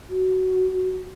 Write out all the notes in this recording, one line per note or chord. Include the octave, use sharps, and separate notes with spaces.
F#4